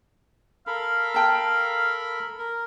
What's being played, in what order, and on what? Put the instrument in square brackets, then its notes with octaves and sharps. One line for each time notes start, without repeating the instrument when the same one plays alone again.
[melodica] A4 A#4 B5 [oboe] F5
[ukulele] G5 A5
[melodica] A#4